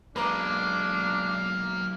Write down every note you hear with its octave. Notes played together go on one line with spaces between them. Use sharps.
B1 G#3 A#3 D4 B4 A#5 D6